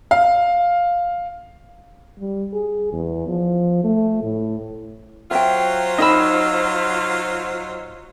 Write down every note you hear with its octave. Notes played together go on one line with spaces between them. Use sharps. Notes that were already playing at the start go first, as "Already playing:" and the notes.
F5
G3
G#4
E2
F3
A3
A2
F#3 F4 C5 E5 G5
D#4 D#5 E5 B5 E6